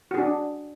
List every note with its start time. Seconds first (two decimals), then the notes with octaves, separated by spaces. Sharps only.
0.11 F#4
0.14 G#4
0.18 D4